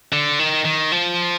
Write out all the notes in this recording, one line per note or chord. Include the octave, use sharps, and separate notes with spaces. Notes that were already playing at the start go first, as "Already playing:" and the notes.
D3
D#3
D#3
F3